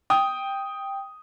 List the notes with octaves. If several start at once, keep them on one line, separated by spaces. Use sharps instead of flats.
G5 D#6